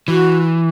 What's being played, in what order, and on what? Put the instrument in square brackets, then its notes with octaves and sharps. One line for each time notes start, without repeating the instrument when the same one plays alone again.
[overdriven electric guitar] E3 [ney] F#4